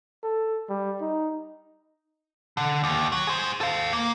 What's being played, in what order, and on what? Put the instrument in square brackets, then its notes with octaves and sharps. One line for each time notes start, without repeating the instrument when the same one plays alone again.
[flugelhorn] A4
G3
D#4
[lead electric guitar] D3
D#2
F#3
G#4 C5
A4 F5
A#3